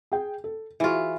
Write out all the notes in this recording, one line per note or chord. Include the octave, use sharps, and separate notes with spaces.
G#4 G5
A4
E3 F4 F#4 G#4 E5